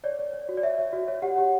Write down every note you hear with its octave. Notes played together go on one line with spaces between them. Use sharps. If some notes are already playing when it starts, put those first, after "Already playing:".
C#5 D5
C#5
C#5
F#4
D5
C#5 E5
C#5
F#4
C#5
G4 F#5
G4